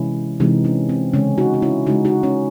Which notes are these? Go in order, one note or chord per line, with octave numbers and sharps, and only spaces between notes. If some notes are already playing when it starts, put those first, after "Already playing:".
Already playing: C3 E3 G#3 C#4 E4
C3 E3 G#3 C4 D#4
C#4
C4
C#3 G#3 C#4
D#4 F#4
F#4
C#4 E4
C#3 G#3 D#4 F#4
D#4 F#4
C#4